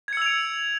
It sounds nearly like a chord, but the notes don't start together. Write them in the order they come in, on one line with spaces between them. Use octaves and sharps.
G#6 C#7 E6 F7 D7